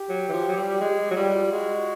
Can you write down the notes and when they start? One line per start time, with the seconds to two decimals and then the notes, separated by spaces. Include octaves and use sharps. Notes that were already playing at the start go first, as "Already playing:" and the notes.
Already playing: G4
0.09 F#3
0.29 E3
0.33 F3
0.48 F#3
0.57 G3
0.81 G#3 G4
1.11 F#3
1.16 G3 F4
1.52 G#3 F#4